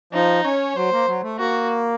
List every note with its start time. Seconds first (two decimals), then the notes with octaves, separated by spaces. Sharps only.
0.13 F3 D#4
0.45 C#4 C#5
0.76 F#3 C5
0.92 A#3
1.07 F#3
1.23 A3
1.38 A#3 F#4